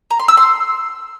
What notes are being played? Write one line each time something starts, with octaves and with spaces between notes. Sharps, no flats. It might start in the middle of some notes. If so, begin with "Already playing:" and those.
A#5
C6
E6
C6